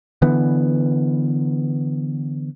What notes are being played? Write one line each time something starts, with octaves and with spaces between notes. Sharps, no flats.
D3 E3 B3